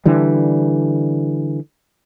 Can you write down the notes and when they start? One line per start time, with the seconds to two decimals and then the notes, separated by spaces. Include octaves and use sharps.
0.06 D3 E3 G3